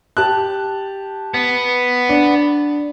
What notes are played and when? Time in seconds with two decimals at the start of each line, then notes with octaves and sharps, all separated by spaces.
0.17 G4 A5 F#6
1.34 B3
2.09 D4